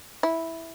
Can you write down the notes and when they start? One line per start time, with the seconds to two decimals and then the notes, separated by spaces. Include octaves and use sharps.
0.23 E4